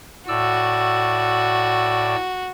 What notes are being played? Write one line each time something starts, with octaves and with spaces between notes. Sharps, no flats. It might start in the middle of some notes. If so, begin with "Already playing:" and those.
A2 F#4 D5 E6